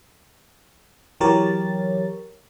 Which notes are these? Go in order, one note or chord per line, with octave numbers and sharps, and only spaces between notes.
E3 F#3 G4 A#4 C#5 A6